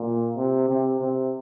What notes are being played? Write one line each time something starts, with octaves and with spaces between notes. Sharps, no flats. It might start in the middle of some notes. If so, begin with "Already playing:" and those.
Already playing: A#2
C3
C3
C3